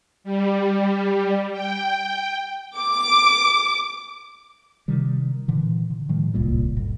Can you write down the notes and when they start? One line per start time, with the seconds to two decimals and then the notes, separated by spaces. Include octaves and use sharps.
0.24 G3
1.52 G5
2.78 D6
4.88 C3 D#3 G3
5.48 A#2 D3 E3
5.90 D3
6.09 A2 D#3 F3 G#3
6.34 D1 C2 A#2 G3
6.76 D1 G1 B2